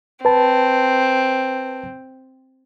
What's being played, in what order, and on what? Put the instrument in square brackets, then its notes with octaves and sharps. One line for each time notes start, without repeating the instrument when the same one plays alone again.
[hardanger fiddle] C4 [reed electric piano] B4 A5